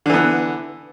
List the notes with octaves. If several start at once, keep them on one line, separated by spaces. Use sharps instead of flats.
D3 E3 B3